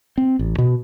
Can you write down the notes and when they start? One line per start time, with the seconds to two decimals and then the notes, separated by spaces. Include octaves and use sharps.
0.18 C4
0.39 A1
0.58 B2